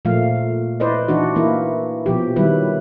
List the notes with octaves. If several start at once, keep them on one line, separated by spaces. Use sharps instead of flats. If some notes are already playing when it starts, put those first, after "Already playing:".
A#2 F3 A3 A#3 F5
E4 B4 C5 D5 D#5
E3 D4 D#4 F#4
E3 A#3 E4
B2 F3 G4
D#3 F#3 G3 E4 B4